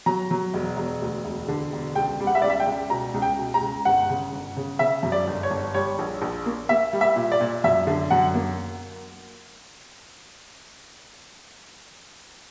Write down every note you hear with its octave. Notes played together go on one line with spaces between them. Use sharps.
F#3 A#5
F#3
E1
E1
D2
E1
D3
E1
C#2 G5
G3
F#5
E5
C#2 D5
E5
G5
C#2
B2 A#5
C#2
G5
B2
A#5
C#2
G1 F#5
C#3
G1
C#3
C#3 E5
F#2
D5
G1
C#5
G1
G3 C#5
A#1
A#1
A#3
A#3 E5
G3
E5
A#2
D5
A#2
F#2 E5
D3
F#2 F#5
A#3